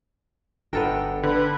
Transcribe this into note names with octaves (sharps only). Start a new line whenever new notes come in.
G1 B3 D4 A4 A#4 G5
D3 B4